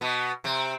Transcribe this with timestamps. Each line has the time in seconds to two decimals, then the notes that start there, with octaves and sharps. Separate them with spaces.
0.01 B2 B3
0.44 C3 C4